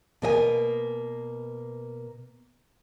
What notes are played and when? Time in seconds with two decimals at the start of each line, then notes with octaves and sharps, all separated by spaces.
0.22 B2 A#3 D#5 G#5